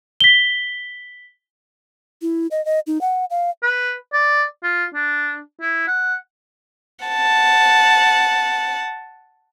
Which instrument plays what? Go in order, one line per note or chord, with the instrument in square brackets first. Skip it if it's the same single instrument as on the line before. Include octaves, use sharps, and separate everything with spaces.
[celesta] B6 G7
[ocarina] E4
D#5
D#5
D#4
F#5
F5
[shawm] B4
D5
F4
D4
E4
F#5
[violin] F#5 A5